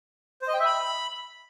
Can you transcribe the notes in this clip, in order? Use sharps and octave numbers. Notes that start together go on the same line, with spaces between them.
C5
D#5
G5
E5
B5